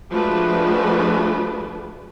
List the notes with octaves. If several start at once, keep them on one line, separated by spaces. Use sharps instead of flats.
F3 G#3 A3 D4 F#4 B4